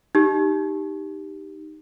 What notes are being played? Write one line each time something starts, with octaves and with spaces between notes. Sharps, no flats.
D#4 G4